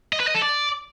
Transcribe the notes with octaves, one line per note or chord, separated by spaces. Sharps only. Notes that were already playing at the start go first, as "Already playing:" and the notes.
D#5
B4
D#5
A4
D5